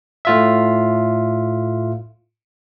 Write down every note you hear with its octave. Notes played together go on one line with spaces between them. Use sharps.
A2 F4 E5